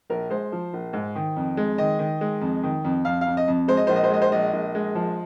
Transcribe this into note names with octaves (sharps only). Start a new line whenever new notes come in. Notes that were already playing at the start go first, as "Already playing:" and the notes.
A#1 A#4
G#3 C5
F3
A#1
G#2
D#3
F2
G#3
D#3 D#5
D#3
G#3
F2
D#3
F2
F2 F5
F5
F2
D#5
F2
G#3 C5
D#5
A#1 C5
D#5
C5
G#3 D#5
C5
A#1 D#5
A#1
G#3
F3